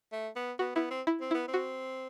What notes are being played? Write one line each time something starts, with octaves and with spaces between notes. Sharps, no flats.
A3
B3
B3 F#4
B3 E4
C4
E4
C4
B3 E4
C4
F#4